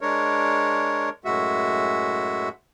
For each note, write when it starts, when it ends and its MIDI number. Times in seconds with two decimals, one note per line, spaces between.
0.01 1.10 56
0.01 1.10 62
0.01 1.10 70
0.01 1.10 73
1.25 2.49 42
1.25 2.49 45
1.25 2.49 56
1.25 2.49 66
1.25 2.49 76